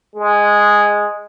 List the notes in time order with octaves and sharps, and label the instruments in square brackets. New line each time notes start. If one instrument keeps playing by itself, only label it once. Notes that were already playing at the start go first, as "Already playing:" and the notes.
[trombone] G#3